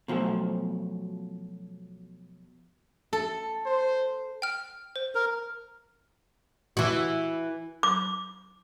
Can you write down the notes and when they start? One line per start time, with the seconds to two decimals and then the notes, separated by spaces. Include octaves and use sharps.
0.08 B2 F3 F#3 A3
3.13 A4
3.66 C5
4.42 G5 F6
4.96 C5
5.15 A#4
6.77 E3 F#4
7.83 D6